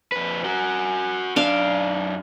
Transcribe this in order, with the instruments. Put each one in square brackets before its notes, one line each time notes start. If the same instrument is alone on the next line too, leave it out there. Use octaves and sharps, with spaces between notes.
[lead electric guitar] F2 B4
F#4 A#4
[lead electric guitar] F#2 D5 [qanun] D4 F5